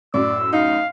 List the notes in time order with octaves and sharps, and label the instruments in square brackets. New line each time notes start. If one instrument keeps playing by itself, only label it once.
[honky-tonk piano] F#2 A2 [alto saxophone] D5 [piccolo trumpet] E6
[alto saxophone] D#4 [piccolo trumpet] F5